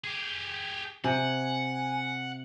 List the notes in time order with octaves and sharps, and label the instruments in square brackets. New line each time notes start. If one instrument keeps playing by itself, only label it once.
[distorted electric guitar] G4 G#4
[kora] C3 [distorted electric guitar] F#5 [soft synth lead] G#5